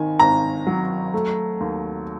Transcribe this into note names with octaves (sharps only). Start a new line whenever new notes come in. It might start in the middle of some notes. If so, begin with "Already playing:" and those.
Already playing: G#1 D#3 G#5
G#1 A#5
F#3
A3
D#2